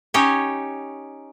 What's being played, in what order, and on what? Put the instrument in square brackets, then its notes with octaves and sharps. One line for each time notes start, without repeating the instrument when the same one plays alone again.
[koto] C#4 D#4 G4 C#5